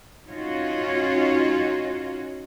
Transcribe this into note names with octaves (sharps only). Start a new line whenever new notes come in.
C#4 D#4 F4 F#4 C#5